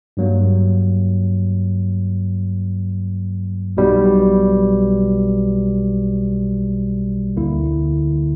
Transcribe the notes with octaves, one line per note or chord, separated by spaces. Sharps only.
G2 F#3 A#3
B1 B2 G3
D2 D3 A#3 E4